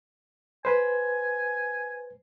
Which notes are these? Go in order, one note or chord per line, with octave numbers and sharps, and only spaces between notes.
B4 C5 G#5